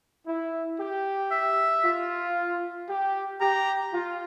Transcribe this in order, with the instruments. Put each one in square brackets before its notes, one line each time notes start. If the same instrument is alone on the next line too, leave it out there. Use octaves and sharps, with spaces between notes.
[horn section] E4
G4
[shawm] E5
[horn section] F4
G4
[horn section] G4 [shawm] A#5
[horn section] F4